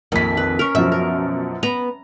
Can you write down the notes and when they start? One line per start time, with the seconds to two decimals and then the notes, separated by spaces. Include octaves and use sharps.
0.12 A#1 F2 D#3 B6
0.37 B4
0.59 C#4 A#4
0.75 F#2 B2 F3 E5
0.92 A#4
1.63 B3 A#5